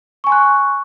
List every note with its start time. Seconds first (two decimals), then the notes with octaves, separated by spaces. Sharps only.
0.24 C#6
0.27 G#5
0.29 C6
0.32 F#6